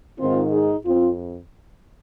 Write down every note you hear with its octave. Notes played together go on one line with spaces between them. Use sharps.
G#2 D#3 C4 F4
D#4 G#4
F2 C4 F4